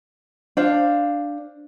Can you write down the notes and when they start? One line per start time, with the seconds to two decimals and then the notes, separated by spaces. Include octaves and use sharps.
0.57 D4 C5 F5